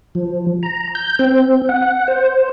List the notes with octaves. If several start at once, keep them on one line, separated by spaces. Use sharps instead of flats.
F3
A#5
G6
C4
F#5
C5